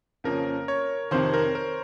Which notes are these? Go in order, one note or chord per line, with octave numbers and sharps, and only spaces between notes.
F2 C#3 F3 A#3 C#4 A#4
C#5
F2 C3 D#3 C5
A#4
A#4